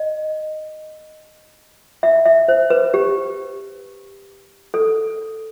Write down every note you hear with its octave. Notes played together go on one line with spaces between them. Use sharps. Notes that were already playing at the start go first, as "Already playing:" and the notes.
Already playing: D#5
E5
E5
C5
B4
G4
A4